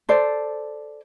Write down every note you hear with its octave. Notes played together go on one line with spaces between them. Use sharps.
A4 C5 D5